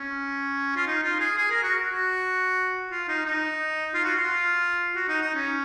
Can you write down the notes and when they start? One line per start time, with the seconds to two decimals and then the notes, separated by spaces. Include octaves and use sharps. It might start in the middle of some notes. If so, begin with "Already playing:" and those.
Already playing: C#4
0.76 F4
0.87 D#4
1.03 F4
1.20 G#4
1.38 G#4
1.51 A#4
1.63 F#4
1.89 F#4
2.91 F4
3.09 D#4
3.25 D#4
3.94 F4
4.04 F#4
4.16 F4
4.96 F#4
5.08 D#4
5.21 D#4
5.34 C#4